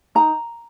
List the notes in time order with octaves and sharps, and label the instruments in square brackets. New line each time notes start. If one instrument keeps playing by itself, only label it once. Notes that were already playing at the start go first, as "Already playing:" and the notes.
[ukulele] D#4 A#5